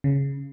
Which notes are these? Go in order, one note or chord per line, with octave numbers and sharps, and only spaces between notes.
C#3